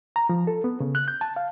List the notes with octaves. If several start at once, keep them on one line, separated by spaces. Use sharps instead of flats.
A#5
F3
A4
B3
C#3
F#6
G6
A5
F5